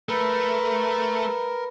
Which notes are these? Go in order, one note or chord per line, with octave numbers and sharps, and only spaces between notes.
A3 A#4 B4 B5